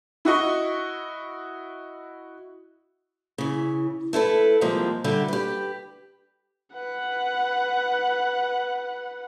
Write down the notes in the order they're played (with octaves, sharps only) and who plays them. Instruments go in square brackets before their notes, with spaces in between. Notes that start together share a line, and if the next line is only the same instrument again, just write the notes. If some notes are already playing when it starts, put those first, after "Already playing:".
[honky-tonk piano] E4 F#4 D#5 C#6
[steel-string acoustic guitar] C#3 E3
A3 E4 A4 B4
C3 F3 G3 G#3 A#3
D3 G3 F#4 G4 E5
G4 B4
[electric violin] B4 F#5